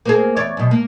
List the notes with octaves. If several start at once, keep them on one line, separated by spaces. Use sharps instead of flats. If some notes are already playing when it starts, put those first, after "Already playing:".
A#3 C4 G#4
E2 C#5 D5
F#2 B2
A#3